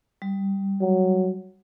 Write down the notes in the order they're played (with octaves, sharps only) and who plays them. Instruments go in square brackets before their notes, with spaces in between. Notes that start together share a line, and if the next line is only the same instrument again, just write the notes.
[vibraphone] G3
[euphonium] F#3